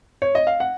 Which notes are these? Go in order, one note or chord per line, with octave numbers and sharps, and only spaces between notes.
C#5
D#5
F5
F#5